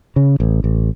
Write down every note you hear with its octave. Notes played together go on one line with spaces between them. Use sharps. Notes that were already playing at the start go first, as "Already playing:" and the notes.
C#3
A1
A1